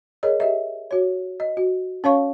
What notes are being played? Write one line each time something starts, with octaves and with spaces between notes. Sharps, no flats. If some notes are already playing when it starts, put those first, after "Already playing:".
G#4 A#4 C#5 D#5
G4 D#5 E5
F#4 C#5
D#5
F#4
C#4 C#5 F5 C#6